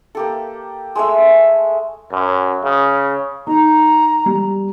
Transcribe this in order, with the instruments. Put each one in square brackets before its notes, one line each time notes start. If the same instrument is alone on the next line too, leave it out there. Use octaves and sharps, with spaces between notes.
[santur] A#3 G4 A4
G#3 A3 E5
[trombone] F#2
C#3
[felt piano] D#4 [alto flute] A#5
[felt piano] G3